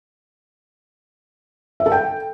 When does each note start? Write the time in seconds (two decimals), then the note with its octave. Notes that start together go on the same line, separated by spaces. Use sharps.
1.80 E5
1.86 A4
1.92 G5